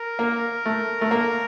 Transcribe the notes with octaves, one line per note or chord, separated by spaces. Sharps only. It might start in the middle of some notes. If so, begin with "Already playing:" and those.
Already playing: A#4
A#3
A3
A3
A#3